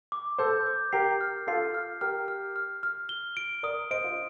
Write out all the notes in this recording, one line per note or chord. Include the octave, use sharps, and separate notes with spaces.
D6
A4 C5 G6
D6
G4 A#4 C7
F6
F4 A4 C7
F6
G4 A#4 F6
F6
F6
F6
G7
D7
A#4 D5 D#6
C5 D#5 D7
F4